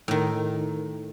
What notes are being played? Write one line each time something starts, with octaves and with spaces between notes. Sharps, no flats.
A2 D#3